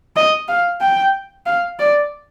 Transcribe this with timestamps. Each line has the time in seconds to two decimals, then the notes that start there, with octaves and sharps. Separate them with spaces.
0.16 D#5
0.48 F5
0.81 G5
1.46 F5
1.79 D5